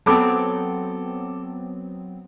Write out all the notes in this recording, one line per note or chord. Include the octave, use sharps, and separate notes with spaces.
F#3 B3 C4 A4 D6